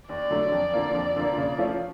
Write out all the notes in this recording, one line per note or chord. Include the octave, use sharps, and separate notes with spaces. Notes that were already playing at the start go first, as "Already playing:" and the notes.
D#2 D5
D3 F#3 A3
F2
D3 F3 A#3
F2
D3 F3 A#3
C#3
F3 A3 C#4 F4